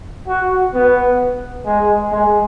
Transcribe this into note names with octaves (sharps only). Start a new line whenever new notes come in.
F#4
B3
G#3
G#3